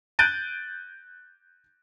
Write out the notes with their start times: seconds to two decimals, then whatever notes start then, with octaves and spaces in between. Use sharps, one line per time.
0.19 F#6 G6 A6 D7 D#7